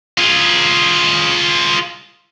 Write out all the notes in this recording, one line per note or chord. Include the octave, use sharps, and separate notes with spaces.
F4 G#4